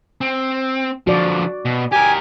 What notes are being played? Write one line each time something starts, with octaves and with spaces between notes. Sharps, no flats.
C4
D3 F3 F#4 D5
B2
G4 A#4 G#5